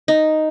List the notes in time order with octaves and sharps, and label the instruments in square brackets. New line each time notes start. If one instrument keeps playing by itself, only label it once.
[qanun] D#4